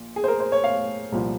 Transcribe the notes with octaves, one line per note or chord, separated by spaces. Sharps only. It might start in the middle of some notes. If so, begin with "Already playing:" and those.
Already playing: A#1 A#2
G#4
C5
A#4
C5
C#5
F5
C2 A#2 F3